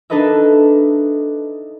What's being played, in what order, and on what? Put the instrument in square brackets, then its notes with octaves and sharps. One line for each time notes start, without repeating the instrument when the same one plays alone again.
[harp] D4 D#4 A4 B4 D#5 E5